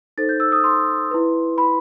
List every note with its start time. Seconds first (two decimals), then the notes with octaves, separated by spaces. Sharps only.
0.18 D#4 A4 C5 A6
0.29 G6
0.40 E6
0.52 D#6
0.64 C6
1.11 E4 B4
1.58 B5